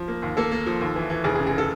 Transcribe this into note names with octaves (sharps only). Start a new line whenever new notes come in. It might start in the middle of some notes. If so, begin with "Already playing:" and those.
Already playing: F3
A#3
D#2
A#3 A4
A#3
F3
D#2
E3
E3
F1 G#4
G#4
C#3
G#4
A4